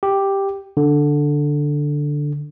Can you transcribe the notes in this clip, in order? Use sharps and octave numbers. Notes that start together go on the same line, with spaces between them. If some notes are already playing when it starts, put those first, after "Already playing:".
G4
D3